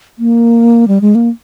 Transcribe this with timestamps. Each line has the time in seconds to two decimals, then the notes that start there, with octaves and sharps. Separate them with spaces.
0.19 A#3
0.88 G3
1.01 G#3
1.15 A#3